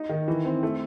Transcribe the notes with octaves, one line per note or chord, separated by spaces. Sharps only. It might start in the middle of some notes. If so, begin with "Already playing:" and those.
Already playing: D#4
D#3
E3
C4
A3